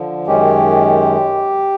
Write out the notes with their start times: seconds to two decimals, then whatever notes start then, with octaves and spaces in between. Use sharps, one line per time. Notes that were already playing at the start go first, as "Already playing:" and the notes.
Already playing: D3 F3
0.27 F#2 D#3 G#3 C#4 G4